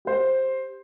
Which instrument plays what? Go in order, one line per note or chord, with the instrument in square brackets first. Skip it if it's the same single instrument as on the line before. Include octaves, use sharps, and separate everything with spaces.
[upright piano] G4 C5